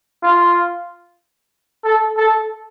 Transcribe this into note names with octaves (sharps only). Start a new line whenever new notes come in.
F4
A4
A4